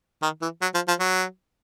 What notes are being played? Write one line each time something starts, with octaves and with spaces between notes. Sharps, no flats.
D#3
E3
F#3
F3
F3
F#3